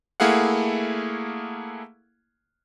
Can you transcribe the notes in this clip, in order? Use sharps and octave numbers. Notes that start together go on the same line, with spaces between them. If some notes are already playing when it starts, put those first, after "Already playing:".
A3 A#3 E4 G#4 F5 F#5